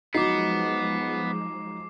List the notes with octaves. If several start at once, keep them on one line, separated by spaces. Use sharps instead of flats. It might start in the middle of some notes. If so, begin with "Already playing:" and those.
F3 F#3 G#3 B3 D#4 D6 C7